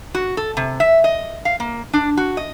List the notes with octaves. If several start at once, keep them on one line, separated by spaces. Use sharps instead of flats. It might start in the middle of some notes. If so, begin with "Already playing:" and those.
F#4
A4
C3
E5
D#5
F5
A#3
D4
F#4
D#5